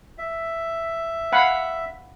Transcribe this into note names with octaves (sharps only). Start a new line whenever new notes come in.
E5
F5 F#5 B5